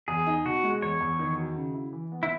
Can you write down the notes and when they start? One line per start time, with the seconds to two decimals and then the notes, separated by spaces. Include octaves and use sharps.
0.08 E2 G#4
0.27 D#4
0.45 B2 F#4
0.63 G#3
0.82 E2 C#5
1.01 E2
1.19 D#3
1.38 F#3
1.56 C#3
1.74 E4
1.93 E3
2.12 B3
2.23 E4